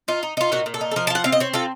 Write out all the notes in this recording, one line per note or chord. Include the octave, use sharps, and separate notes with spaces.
D#4 F4
D#4
D#4 F4
A#2 F#4
A#2
A4
D#4
A4
F3 A#4
A5
F4 F#5
C4 F5
D#5
C4 C#5
F4 A4